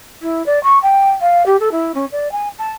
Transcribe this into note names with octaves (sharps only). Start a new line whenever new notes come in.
E4
D5
C#6
G5
F5
G4
A4
E4
C#4
D5
G#5
A5